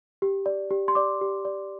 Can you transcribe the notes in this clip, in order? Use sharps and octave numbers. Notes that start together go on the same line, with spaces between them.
G4
D5
G4
C6
D5 D6
G4
D5